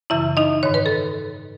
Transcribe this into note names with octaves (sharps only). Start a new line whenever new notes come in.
F#2 C#3 E3 E4 E5
D#4 D#5
G#2 D#3 C#5
B4
A4